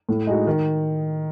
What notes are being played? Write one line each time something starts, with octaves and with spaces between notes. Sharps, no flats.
A2
G#3 D#4 F#4
D#3